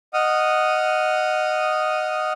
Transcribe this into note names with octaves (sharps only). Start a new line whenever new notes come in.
D#5 F#5 D#6 F6